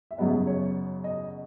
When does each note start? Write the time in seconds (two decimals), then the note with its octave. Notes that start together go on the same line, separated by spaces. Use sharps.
0.11 E5
0.18 F#2 C#3 F#3 B3 D#5
0.47 C#5
1.04 D#5